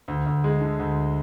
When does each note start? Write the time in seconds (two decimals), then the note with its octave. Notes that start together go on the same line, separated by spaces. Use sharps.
0.08 D2
0.26 D2
0.44 G#3
0.61 D3
0.79 D2